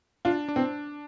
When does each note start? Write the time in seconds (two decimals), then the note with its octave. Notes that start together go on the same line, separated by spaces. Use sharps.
0.25 D4 F4
0.48 D4
0.56 C4